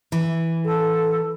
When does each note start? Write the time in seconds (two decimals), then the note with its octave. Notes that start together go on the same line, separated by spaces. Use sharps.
0.12 E3
0.65 A4